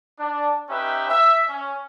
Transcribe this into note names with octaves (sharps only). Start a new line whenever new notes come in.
D4
C#4 D#4 G4 B4 E5
E5
C#4